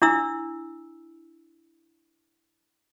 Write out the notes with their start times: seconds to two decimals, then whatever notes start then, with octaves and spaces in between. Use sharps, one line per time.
0.02 D4 E4 E6